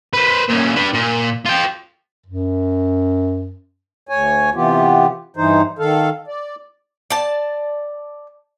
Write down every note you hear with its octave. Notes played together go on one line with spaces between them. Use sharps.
B4 C5
A#2 C#4
D4 B4
A#2
F4 G5
F#2
D2 C#5 G#5
C3 E3 B3 F4 G4
G2 E3 D#4 C5
D#3 A4 F5
D5
D5 A5